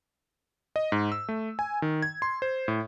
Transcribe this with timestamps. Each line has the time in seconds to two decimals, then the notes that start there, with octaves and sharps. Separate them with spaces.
0.76 D#5
0.92 G#2
1.12 E6
1.29 A3
1.59 G#5
1.82 D#3
2.02 G#6
2.22 C6
2.42 C5
2.68 A2